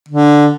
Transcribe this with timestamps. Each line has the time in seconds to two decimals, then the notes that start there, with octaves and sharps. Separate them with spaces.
0.09 D3